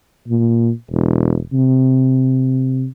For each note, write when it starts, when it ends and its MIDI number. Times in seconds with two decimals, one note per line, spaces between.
0.28 0.70 46
0.91 1.39 28
1.53 2.86 48